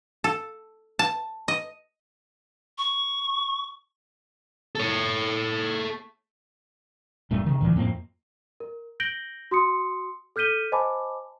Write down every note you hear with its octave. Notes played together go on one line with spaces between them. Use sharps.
A4
A5
D#5
C#6
A4 C#5
E1 G2 A#2 A3
C3 D#3
D2 A#2 E3
F2 A2 A#3 C4
A#4
G6 A#6 D7 F#7 G7
F#4 C6 D#6 C#7
A4 F6 G6 B6 D#7 G7
C5 D#5 G#5 A5 B5 D6